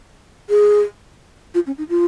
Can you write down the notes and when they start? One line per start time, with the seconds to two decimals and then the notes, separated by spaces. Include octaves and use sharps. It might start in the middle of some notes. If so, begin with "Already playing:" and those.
0.49 G#4
1.54 F4
1.67 C#4
1.78 D#4
1.89 F4